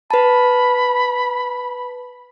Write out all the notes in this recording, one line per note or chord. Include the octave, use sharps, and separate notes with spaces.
B4 A5 B5